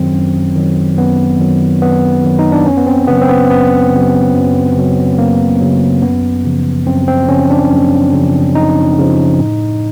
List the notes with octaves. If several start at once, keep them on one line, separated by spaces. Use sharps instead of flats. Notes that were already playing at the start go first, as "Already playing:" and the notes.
Already playing: F#2 D#3 F#3 C4
F#2
D#3 F#3
F#2 B3
D#3 F#3
F#2 B3
D#3 F#3
D#4
D4
F#2 C#4
B3
C4
C#3 F#3 B3
C4
B3
F#2 B3
C#3
F#3
F#2
C#3 F#3
F#2 A#3
C#3 F#3
F#2 B3
C#3 F3
F#2 C4
C4
C#3 F3 C#4
D4
F#2
C#3 F3
F#2 D#4
C#3 F3
A2